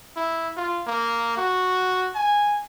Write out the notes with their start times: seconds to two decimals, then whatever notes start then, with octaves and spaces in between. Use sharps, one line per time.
0.17 E4
0.57 F4
0.87 A#3
1.37 F#4
2.15 G#5